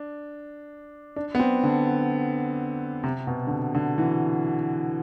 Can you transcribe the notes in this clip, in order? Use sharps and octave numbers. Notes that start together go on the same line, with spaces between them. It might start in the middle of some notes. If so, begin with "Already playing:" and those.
Already playing: D4
D4
B3
C4
D3
C3
B2
D3
C3
D3
E3